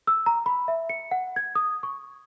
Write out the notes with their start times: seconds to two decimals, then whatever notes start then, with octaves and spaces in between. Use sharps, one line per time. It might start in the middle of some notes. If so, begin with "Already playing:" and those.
0.07 E6
0.26 A#5
0.46 B5
0.68 E5
0.89 C#7
1.11 F#5
1.36 G#6
1.55 D#6
1.83 C#6